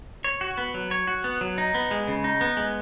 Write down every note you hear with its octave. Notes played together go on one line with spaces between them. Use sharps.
C#5
F#4
B3
F#3
C#5
F#4
B3
F#3
D#4
B3
G#3
C#3
D#4
B3
G#3